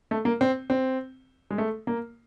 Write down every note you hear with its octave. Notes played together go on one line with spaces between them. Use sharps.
A3
A#3
C4
C4
G#3
A3
A#3